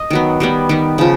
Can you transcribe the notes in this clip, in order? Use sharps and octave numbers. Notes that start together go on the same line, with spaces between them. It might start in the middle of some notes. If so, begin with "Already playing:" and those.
Already playing: D#5
D#3 F#3 B3
D#3 G3 B3
D#3 G3 B3
C#3 F3